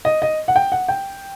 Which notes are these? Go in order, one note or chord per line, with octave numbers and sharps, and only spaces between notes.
D#5
D#5
F#5
G5
F#5
G5